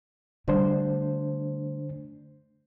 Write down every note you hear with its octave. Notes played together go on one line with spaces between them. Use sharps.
D3 G3 A3 D4 C5